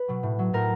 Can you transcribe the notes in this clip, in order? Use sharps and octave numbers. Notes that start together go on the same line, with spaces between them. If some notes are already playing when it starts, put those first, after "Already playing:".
Already playing: B4
B2 F#3
A2
F#3
A2 A#4